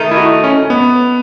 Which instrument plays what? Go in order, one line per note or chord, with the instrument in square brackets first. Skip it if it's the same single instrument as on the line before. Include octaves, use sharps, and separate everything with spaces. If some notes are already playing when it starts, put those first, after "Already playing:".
Already playing: [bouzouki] D#3 A3 D#4
[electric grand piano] E4
F#4
C#4
B3